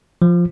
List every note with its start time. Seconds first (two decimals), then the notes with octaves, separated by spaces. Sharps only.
0.22 F3